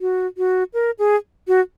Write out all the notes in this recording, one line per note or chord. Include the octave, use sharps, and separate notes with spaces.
F#4
F#4
A#4
G#4
F#4